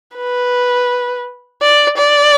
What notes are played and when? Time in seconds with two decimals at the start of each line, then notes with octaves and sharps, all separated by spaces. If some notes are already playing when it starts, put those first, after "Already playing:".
0.16 B4
1.62 D5
1.97 D5